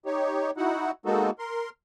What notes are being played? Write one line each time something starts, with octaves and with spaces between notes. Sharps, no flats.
D#4 G4 C#5
D#4 E4 F#4 F#5
G#3 A#3 B3 D#4 F#4 A4
A#4 C6